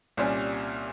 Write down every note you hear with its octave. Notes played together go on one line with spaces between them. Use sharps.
C2 A#2 G3 C#4